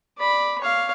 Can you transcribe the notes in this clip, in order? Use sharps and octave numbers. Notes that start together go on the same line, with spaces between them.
D5 B5
C#5 F5